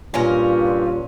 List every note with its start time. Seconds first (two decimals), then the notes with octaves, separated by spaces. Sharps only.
0.14 G2 A#2 C#4 F4 A#4